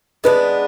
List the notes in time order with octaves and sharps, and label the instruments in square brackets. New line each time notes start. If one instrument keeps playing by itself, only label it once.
[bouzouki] G#3 B3 D4 [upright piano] B4